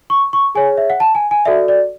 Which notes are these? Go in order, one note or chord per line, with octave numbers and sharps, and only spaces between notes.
C#6
C#6
G#4 C#5 G#5
E5
F#5
A5
G#5
G#5
F#4 A4 D5 E5
D5